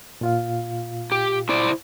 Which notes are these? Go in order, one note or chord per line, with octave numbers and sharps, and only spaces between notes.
A#2 F4 F5
G4
E4 C5 D5